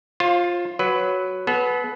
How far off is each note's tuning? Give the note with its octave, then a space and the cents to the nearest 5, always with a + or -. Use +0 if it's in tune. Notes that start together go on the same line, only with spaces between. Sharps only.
F4 +5 C5 +35
F#3 +0 B4 +10
B3 +0 A4 -45